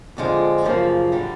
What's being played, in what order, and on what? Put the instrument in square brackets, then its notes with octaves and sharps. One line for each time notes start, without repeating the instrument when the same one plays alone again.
[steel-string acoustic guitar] F2 D3 F3 G#3
F#2 C#3 F3 A#3
D3 G3